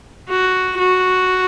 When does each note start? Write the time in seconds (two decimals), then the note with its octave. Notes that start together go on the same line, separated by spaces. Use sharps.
0.29 F#4
0.79 F#4